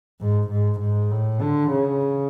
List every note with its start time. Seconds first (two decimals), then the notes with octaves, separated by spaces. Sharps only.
0.20 G#2
0.50 G#2
0.80 G#2
1.11 A2
1.41 D3
1.71 C#3